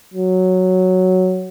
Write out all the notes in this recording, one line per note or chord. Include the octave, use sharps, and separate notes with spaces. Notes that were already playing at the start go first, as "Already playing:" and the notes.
F#3